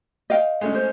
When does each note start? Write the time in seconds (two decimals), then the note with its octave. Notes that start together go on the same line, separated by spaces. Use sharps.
0.30 D#5 F5 G5
0.61 G#3 A3 C#4
0.75 C5